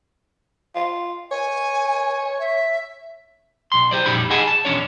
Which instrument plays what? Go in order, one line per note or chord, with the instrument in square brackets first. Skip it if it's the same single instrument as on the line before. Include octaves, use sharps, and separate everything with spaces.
[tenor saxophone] F4
[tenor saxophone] C#5 [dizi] G#5
[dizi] E5
[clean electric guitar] B1 C6
G4 C5 D5
F2 A#2 G3 D#4 B5
G#4 D#5 F#5 G#5 A5 B5
A5
B1 E2 C#4 D4 C#5